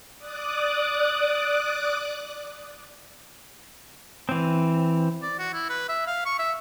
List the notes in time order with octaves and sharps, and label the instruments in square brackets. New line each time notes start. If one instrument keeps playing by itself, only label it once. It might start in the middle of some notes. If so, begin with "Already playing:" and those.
[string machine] D5 D6 D#6 F#6
[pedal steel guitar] E3 C4
[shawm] D5
F#4
E4
B4
E5
F5
C#6
E5